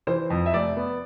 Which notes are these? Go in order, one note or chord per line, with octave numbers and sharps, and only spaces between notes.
E3 C5
F2
E5
F1 D5
B3